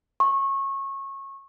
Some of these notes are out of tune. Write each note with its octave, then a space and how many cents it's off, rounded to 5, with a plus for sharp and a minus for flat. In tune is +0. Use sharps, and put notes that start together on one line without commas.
C#6 -25